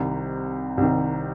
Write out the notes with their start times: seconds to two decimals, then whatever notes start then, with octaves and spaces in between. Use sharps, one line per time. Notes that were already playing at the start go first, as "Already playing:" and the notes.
Already playing: C2 C3 D#3
0.77 C2 C3 D#3